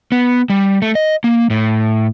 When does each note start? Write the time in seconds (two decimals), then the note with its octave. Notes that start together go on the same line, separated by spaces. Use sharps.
0.12 B3
0.50 G3
0.82 A3
0.95 D#5
1.24 A#3
1.50 A2